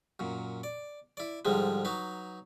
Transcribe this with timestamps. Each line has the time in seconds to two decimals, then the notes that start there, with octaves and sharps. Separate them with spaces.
0.19 F#2 A#2
0.63 D5
1.17 E4 D5
1.45 G#2 D3 F3 G3 G#3
1.85 F#3 D#4 B4